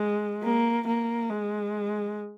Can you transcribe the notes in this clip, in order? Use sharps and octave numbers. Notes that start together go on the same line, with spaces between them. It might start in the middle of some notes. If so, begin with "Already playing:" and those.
Already playing: G#3
A#3
A#3
G#3